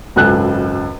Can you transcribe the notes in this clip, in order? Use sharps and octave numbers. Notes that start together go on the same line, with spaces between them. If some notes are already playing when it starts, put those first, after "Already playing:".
G#1 C#2 F#2 A4 G#5 F#6